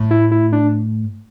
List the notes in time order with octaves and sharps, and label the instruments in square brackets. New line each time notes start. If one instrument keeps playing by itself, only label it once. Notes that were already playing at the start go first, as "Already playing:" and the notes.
Already playing: [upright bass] A2
[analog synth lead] E4
E4
D4